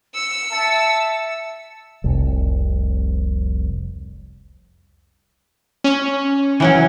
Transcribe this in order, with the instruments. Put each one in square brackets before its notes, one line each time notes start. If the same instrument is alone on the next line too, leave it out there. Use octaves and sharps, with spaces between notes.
[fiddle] E6 [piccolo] C#7
[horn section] E5 A5
[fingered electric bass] F1 C2
[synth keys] C#4
[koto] E3 F#3 C#4